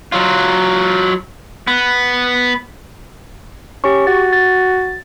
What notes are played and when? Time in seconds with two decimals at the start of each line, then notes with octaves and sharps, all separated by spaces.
0.12 F#3 F4
1.67 B3
3.84 C#4 G4 C#6
4.07 F#4 A6
4.33 A6